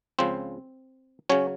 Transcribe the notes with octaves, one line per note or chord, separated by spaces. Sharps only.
C#2 C#3 F3 C4 C5
C#3 F#3 C#4 C#5